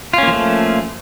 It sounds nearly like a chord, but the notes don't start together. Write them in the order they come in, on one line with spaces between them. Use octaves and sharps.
F4 C#4 A#3 F3 A3